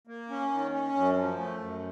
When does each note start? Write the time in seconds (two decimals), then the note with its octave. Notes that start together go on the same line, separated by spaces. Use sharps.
0.07 A#3
0.30 C#4
0.51 D#3
0.73 C#4
0.94 F#2
1.16 F3
1.38 A3
1.60 F#2